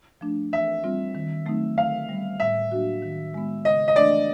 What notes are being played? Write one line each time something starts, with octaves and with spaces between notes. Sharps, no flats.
F3 A3 D4
E3 E5
G3 C4 F4
D#3
F#3 A3 C4 D#4
D3 F5
G3 B3
A2 E5
F#3 A#3 D4 F#4
D#3
G#3 B3
C#3 D#5
D#5
E3 A3 D4 D5